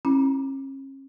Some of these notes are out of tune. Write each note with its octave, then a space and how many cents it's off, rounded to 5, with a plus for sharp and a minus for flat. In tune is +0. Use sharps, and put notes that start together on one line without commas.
C#4 -40 E4 +0 B5 -40